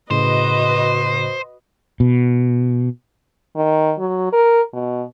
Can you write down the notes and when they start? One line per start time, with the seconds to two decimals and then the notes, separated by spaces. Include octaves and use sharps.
0.11 A2 C#3 F#4 B4 C5 D#5
2.00 B2
3.56 D#3
3.98 F#3
4.32 A#4
4.73 B2